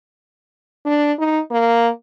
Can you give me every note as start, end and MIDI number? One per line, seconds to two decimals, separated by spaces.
0.85 1.13 62
1.19 1.40 63
1.51 1.89 58